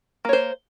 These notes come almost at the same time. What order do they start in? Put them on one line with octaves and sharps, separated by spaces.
A#3 C#5 C5